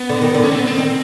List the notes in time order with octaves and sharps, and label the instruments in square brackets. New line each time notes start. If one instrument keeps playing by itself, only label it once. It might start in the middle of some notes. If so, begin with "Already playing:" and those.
Already playing: [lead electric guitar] B3
[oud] D3
D#3
D3
[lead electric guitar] C#4
C4
B3
C4
[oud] D#3